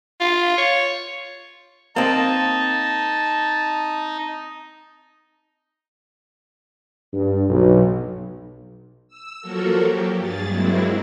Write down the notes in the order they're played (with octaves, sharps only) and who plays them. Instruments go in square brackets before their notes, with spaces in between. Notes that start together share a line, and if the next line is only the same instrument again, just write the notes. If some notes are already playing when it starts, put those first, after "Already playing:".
[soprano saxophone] F4
C#5
[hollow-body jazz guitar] A#3 C4 [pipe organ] D#4 [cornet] A5
[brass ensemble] G2
B1
[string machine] E6
F3 F#3 A#3 F#4 A4 A#4
F#3 G4
G2 G#4 A6
F#3 G#3 A#3 C4 E4